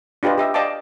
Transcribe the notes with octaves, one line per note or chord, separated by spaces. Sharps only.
D4 F4 G4 B4 D#5
G4 D#5 E5
D5 D#5 F5 G5 A5 D6